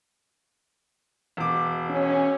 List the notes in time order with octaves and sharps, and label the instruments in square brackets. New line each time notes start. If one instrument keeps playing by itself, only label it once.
[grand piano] E1 D6
[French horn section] C#4